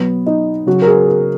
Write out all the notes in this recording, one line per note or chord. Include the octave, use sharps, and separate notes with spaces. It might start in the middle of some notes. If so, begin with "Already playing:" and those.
Already playing: B2 F#3 B3
D#4
C#3 F#3 F#4
A#4
G#4
A#4